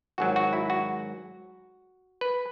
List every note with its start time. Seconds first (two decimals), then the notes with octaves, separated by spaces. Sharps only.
0.18 G#1 G#2 F#3 F#4
0.36 F#4
0.53 E4
0.70 F#4
2.21 B4